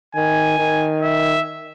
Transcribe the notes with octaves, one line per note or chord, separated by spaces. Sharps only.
D#3 G#5
D#3
E5